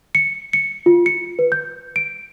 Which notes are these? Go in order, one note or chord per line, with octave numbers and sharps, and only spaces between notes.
C#7
C#7
F4
C#7
B4
G6
D7